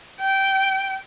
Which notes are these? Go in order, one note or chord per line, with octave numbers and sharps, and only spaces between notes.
G5